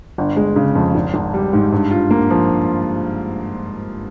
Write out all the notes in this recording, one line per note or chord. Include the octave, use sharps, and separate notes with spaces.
G1
G#3
C#3
F2
G#1
G#1
G3
G#2
G2
F4
A#3
F3